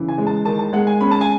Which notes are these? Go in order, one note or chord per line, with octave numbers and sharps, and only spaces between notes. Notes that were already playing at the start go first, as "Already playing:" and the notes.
Already playing: C#3 E3
G#5
G#3
A5
D#3 A5
A5
G#3 F#5
G#5
C#4 B5
A5
G#5